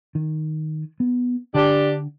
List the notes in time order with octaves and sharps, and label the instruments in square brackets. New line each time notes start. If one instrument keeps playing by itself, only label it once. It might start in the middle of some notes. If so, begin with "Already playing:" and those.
[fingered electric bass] D#3
B3
[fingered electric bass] D3 [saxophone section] D4 G4